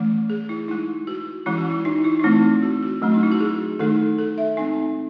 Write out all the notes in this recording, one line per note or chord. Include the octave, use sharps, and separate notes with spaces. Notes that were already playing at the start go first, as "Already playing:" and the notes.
Already playing: E3 A3 C#4
G#4
E4
G#3 D#4 E4
F#4
E3 G#3 C#4 E4
F#4
E4
D#4
E4
D#4
E3 A3 C4 E4
F#4
F#4
F#3 A3 C#4
D#4
E4
F#4
G#4
D#3 A3 D#4 A4
A4
E5
G#3 C4 D#4 G#5